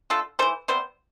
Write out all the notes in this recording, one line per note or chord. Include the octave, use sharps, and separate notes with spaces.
D3 A3 F4 A4
E3 A3 A4 C5
C3 G3 B3 C5